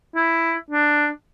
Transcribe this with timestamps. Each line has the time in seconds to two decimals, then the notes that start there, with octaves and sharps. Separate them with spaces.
0.15 E4
0.70 D4